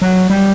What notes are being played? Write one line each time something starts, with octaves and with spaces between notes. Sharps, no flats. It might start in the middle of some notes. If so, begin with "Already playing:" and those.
F#3
G3